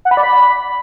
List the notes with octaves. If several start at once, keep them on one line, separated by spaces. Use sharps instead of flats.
F#5
B5
D5
B5